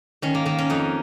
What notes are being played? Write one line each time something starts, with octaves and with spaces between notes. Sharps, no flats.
D#3 C#4
A#3
D#3 A#3
C#4
F2 D#4